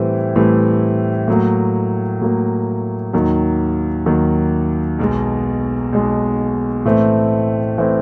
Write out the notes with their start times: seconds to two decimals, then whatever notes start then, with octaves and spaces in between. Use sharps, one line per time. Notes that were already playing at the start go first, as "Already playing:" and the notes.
Already playing: A2 E3 G3 C4
0.36 A2 E3 G3 C4
1.28 A2 F#3 A#3
2.21 A2 F#3 A#3
3.13 D#2 D#3 F#3
4.06 D#2 D#3 F#3
4.99 B1 B2 G#3
5.93 B1 B2 G#3
6.85 A2 E3 A3 C4
7.78 A2 E3 A3 C4